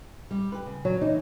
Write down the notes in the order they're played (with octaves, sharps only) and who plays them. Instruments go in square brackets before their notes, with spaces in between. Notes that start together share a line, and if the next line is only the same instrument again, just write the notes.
[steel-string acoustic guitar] G3
G4 B4
C#3
[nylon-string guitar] F#3
[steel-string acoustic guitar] E3 [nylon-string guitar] D#4